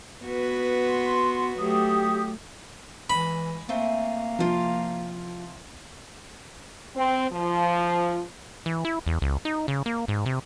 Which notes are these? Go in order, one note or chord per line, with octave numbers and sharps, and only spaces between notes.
B3 F#4 B4
C6
F#3 A3 G4 D#6
E3 G#3 B5
A3 A#3 C4 G#5
C3 F3 F4 G5
C4
F3
E3
E4
E2
C#2
D#4
C#3
A#3
G#2
C3